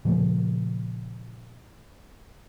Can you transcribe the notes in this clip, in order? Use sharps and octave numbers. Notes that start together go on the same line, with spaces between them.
A#2 C#3 F3 A3